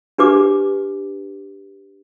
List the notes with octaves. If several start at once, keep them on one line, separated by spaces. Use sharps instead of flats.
D4 G4 B4 D6